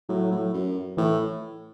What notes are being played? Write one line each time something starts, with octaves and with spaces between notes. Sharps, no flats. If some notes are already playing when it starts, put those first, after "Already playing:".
A2 F#3
A2
F#2
A2 E3